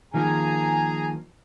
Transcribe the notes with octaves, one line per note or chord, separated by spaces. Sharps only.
D#3 F3 A#3 G#4 G#5 A#5